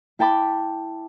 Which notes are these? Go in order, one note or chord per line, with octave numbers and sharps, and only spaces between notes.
E4 G5 A5 B5 D6